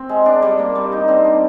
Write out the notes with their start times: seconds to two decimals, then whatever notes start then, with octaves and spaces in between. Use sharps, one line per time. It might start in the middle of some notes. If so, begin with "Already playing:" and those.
Already playing: C4
0.09 G#3
0.26 D4
0.42 G3
0.59 A#3
0.75 G3
0.92 D#4
1.08 C4
1.24 D4